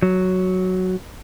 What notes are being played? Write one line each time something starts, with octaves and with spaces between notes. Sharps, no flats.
F#3